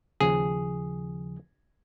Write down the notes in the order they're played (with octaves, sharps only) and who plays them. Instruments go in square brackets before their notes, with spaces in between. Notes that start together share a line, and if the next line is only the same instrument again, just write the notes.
[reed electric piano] D#2 C#3 F3 [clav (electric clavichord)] G#4